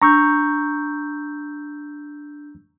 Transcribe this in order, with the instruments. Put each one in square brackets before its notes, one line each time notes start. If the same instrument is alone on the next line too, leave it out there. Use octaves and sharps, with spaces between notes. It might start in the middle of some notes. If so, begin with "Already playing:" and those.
[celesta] D4 E6 G6 [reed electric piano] A#5 C#6